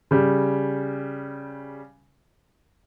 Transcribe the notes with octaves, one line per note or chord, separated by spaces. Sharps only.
C#3 G3